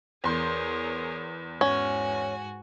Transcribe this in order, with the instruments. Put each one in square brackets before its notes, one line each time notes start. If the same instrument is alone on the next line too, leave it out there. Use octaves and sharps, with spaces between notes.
[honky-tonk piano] E2 C6 G6 [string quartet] G#4 A#4 C#5
[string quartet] G#2 F#4 G#5 [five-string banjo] C#4